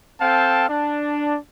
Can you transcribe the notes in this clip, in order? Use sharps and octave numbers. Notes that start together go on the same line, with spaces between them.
C4 A4 F5 G5 A5
D4